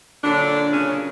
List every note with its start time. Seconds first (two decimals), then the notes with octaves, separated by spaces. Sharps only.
0.22 A#2 D3 F#3 D4
0.72 C#3 C#4